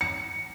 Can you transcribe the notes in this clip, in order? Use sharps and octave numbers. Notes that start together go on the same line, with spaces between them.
C#7